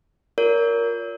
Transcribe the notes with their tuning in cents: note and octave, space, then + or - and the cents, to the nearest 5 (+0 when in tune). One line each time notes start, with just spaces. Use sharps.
F4 +15 A#4 +0 C#5 +45